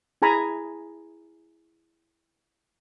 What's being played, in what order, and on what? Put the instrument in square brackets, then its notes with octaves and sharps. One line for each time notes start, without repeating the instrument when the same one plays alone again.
[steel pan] E4 G#4 G#5 A#5 B5